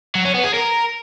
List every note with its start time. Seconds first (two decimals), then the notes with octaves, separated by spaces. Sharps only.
0.15 F#3
0.25 C#4
0.34 B3
0.44 G#4
0.54 A#4